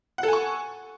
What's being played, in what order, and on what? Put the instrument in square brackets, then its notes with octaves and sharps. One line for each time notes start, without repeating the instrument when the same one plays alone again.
[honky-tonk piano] F#5
A4
G#5
C#6